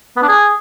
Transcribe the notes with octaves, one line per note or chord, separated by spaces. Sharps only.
B3
D4
G#4